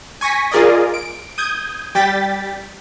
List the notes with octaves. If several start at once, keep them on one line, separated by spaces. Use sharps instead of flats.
G#5 C#6 A#6 B6
F4 G#4 A#4 D5 D#5
D7
D#6 G6 G#6
G3 G5 A6 B6